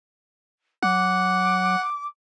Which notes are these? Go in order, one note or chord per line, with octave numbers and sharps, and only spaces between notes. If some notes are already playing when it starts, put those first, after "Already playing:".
F#3 F#5 D6